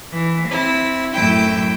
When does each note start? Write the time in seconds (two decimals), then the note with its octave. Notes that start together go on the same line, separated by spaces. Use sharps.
0.13 E3
0.49 C4 E4
1.13 F#2 A2 E4 G5 G6